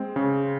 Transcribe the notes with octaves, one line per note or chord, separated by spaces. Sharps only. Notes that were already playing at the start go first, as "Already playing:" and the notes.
Already playing: G#3 C4
C#3